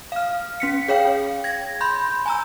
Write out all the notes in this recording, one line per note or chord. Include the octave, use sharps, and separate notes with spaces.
F5 F6
C#4 B6 C#7
G#4 C#5 F5 G5
G#6 A#6
B5 C6 G6
G#5 A#5 E6